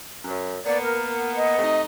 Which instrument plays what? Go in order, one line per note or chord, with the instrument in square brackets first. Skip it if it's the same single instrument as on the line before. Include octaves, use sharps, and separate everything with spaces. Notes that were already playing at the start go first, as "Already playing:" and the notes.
[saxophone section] F#2
[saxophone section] A#3 B3 [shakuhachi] D5
[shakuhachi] A#4
D#5
[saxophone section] C3 A3 D#4